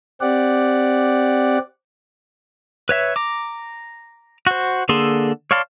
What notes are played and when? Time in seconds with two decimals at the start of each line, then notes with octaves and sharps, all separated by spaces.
0.21 C4 G4 D5 F#5
2.89 B4 C#5 E5
3.16 A#5 D6
4.47 F#4 C5
4.89 D3 A#3 G#4 A4 C6
5.51 C#5 D5 F5 A5 C6